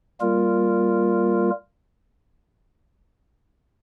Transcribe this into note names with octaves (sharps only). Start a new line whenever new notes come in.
G3 A#3 F4 A#4